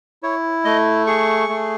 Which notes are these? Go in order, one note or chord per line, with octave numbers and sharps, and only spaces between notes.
E4 C#5
A3 D#5
G#4 C#6
A3